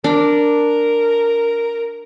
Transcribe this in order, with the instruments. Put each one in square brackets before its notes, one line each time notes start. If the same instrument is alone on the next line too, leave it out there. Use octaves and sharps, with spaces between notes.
[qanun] D4 [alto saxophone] A#4